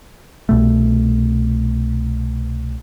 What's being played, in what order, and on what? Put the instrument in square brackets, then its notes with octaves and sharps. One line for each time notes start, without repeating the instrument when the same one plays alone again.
[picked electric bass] C2 B2 A3